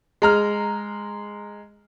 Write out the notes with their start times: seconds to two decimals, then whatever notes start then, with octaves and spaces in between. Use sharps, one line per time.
0.22 G#3 A#5 F6